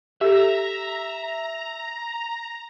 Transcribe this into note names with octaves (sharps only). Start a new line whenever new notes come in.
G4 A4 E5 A#5